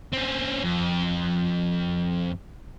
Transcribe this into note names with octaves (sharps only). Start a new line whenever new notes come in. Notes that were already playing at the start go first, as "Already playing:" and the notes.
C4 C#4
F2